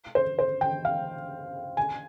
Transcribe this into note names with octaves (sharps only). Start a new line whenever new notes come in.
C5
C5
G5
F5
G#5